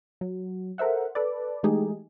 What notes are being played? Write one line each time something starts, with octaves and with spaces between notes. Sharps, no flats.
F#3
A4 A#4 C5 E5 F#5
A4 B4 D5
E3 G#3 A3 D#4 G4 G#4